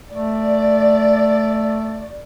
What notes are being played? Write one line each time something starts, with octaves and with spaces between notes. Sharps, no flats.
A3 D5